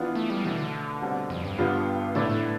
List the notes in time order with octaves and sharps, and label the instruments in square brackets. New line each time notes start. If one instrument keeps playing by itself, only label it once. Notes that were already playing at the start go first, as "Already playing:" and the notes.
Already playing: [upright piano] E3 B3 D4 F4
[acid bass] A3
G3
[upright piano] B2 A3 D4 [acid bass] E3
[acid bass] D3
[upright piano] B2 G3 C4
[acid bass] F2
G2
[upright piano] D3 G3 B3 F4
[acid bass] A2 [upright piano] D3 A3 E4 B4 D5
[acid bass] A2